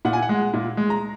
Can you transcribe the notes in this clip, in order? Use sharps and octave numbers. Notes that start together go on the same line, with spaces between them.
A#2 F#5
G#5
F#5
G#3
A#2
G#3
A#5